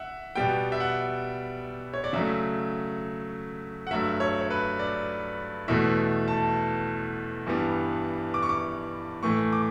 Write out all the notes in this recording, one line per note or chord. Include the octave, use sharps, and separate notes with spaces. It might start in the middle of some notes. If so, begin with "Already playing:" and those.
Already playing: E5 F#5
B2 G3 B3 G5
E5
F#5
C#5
D5
C#3 F#3 A3 E5
F#5
G2 F#3 A3 E5
C#5
C#5
B4
D5
E2 B2 A3 E5
A5
G2 E3 G3 B3
D6
C#6
D6
A2 E3 A3 C#6
D6